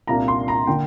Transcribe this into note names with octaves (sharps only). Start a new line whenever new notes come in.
C2 A#2 A#3 D4 A#5
C6
A#5
D3 A#3 G5